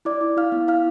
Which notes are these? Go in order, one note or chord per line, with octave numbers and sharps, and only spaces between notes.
E4 D5 D6
E4
E4 F5 F6
B3
E4 F5 F6